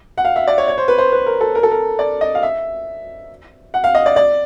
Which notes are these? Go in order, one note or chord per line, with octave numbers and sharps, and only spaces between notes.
F#5
F5
E5
D5
C#5
C#5
C5
B4
C5
B4
A#4
A4
A#4
A4
A#4
D5
D#5
F5
E5
F#5
F5
D#5
D5
D5